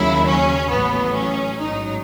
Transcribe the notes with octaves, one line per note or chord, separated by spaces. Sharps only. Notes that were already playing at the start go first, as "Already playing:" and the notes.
Already playing: D#2 C#3 F#3 E4
C#4
A1 A2 F#3 B3
C#4
A1 G#2 F#3 D#4